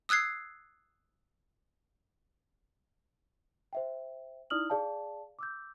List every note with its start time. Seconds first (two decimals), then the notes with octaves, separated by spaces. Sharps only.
0.09 D#6 E6 F#6 G#6 C7
3.73 C5 E5 G5
4.50 D#4 E4 D5 D#6 F6 F#7
4.70 G#4 D5 F5 A5
5.39 D6 E6 G6